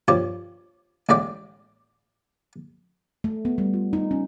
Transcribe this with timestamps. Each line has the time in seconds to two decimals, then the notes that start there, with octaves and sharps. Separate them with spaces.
0.08 G2 F3 G4 C#5
1.09 A1 A2 G#3 D5 G5
3.24 A3
3.45 B3
3.58 G3
3.74 F4
3.93 D#4
4.11 C#4